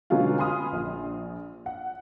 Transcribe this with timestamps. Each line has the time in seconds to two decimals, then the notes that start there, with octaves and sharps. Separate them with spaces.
0.10 B2 D3 F#3 G#3 C#4 F4
0.38 G#5 B5 C6 D#6 F6
0.73 A#1
1.66 F#5